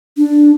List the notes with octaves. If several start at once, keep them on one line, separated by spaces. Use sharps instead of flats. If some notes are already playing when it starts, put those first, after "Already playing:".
D4